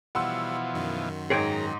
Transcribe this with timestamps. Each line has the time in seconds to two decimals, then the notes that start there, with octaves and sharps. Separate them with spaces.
0.15 B2 E3 F3 G3 F#5 C6 E6
0.75 F#2 D#3
1.30 G#2 D#4 G#4 C#5 G5 A#5